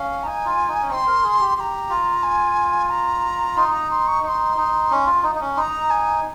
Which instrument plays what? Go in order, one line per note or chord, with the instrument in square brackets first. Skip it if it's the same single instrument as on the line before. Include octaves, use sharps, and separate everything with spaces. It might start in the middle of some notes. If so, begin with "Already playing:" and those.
Already playing: [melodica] C#4 [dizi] F5
[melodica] D#4 [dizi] G#5 A#5
[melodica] F4
D#4
C#4
[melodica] C4 [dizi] C#6
[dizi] C6
[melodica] A#4
G#4
G4
[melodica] G4 [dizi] A#5 C6
[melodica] F4
[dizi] G#5
A#5
[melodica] D#4 [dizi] C6
[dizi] A#5
C6
C#6
[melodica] D#4 [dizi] C6 C#6
[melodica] D#4
C#4
F4
D#4
D#4
C#4
[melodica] D#4 [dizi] A#5 C6
[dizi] G#5